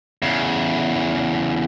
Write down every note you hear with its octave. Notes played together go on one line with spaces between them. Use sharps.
E2 C#3